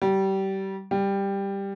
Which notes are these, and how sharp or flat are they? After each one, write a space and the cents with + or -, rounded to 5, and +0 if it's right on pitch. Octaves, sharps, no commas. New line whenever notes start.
G3 -25
G3 +10